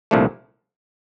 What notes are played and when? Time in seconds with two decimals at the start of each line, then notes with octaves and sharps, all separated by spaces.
0.11 C2 A#2 F3 A3 D4